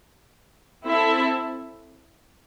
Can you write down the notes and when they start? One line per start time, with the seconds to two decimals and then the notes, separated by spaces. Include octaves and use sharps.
0.85 C4 E4 A4 E5